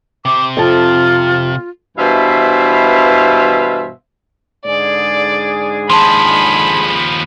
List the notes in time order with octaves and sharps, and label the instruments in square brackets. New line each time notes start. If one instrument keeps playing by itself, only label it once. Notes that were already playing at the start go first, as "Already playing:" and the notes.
[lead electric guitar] C3 C5 [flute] D6
[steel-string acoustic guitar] F2 A5 [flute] F4
[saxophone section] G2 B2 E3 C5 E5 F5
[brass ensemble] G#2 D3 G#4 [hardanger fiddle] D5
[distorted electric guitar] D#2 F3 [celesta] A5 C6 [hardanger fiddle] B5